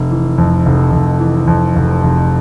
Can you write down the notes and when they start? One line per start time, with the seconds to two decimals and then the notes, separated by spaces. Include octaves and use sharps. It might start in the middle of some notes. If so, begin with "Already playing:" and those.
Already playing: F1
0.11 E3
0.38 F2
0.66 F1
0.92 F1
1.20 E3
1.48 F2
1.76 F1
2.03 F1